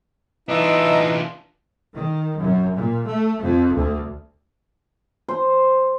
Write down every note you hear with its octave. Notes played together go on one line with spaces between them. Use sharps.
E3 D4 D#4 F4 D#5 E5
D#3
F#2
A#2
A3
F2
D2
C5